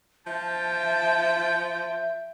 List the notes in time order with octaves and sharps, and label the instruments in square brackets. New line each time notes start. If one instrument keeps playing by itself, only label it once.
[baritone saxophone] F3 [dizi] E5 [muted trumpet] G5 [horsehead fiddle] A5